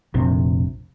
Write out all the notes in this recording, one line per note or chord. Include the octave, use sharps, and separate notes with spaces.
F1 A#1 C3